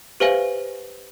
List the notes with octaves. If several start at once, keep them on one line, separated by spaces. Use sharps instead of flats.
G4 B4 C5 E5 F5 G#5